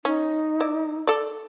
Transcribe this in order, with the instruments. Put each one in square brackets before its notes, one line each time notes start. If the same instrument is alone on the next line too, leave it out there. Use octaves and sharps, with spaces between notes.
[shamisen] C#4 [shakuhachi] D#4
[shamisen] E4 D5
A4 D5